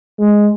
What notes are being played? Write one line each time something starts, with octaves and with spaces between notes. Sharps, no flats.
G#3